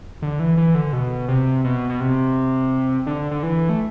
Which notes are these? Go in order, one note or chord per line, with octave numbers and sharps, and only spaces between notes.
D3
E3
E3
D3
B2
C3
B2
B2
C3
D3
D3
E3
A3